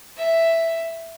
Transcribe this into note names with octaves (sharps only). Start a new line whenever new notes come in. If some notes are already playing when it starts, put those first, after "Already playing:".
E5